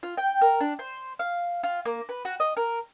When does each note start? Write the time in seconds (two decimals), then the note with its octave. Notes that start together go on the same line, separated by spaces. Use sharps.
0.03 F4
0.17 G5
0.41 A#4
0.60 D4
0.79 C5
1.19 F5
1.63 F4
1.85 A#3
2.09 B4
2.25 F#4
2.40 D#5
2.57 A#4